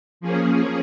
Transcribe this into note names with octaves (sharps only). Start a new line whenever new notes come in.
F3 A#3 C#4 G#4